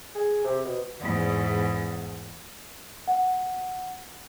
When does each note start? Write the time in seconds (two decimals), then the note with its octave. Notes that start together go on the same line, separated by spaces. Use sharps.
0.16 G#4
0.45 C3
0.65 B2
1.00 E2 G#2
3.08 F#5